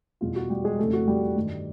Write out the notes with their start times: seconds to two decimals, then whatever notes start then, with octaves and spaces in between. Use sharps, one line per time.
0.21 E2 B2 G3 F4
0.36 F#4
0.50 G3 G4
0.64 G#3 G#4
0.79 F2 C#3 E3 G3 A3 A4
0.93 F#4
1.07 G3 G4
1.36 G2 D#3 G3